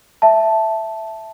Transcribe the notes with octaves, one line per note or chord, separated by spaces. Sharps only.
E5 A5